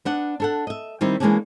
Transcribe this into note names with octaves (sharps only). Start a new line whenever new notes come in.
B3 D4 F#5
D4 A4 F#5
D#5 E5
D#3 G3 C4 D#4 E4
E3 G#3 A#3 B3 C#4 D4